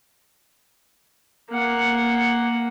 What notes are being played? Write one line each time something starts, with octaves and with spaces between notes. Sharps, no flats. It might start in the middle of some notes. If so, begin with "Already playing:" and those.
A#3 F#5